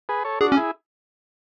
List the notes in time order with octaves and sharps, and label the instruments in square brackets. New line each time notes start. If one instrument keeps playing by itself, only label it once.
[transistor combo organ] G#4 B4
A4 C#5
[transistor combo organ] D4 F#4 [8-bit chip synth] G#4
[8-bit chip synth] C#4
[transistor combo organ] E4 G#4